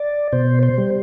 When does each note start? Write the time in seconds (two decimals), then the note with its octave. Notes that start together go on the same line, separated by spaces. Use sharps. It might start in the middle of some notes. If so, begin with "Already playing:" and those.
Already playing: D5
0.33 B2 C5
0.63 C5
0.78 G3